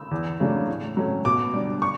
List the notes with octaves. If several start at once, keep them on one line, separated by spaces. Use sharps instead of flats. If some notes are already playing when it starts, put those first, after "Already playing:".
Already playing: E6
E2
C#3 F#3 A3 D4
A2
F#3 A3 C#4
B2 D6
G3 D4
C#6